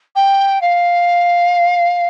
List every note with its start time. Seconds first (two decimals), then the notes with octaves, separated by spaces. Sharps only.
0.15 G5
0.61 F5